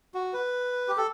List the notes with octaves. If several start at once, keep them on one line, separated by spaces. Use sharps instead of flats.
F#4
B4
G4
A4